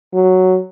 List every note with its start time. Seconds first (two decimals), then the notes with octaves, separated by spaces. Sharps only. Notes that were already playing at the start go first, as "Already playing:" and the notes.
0.13 F#3